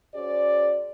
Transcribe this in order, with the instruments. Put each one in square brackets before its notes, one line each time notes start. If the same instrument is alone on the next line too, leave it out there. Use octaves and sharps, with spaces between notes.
[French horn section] C#4 F#4 G#4 C5 D5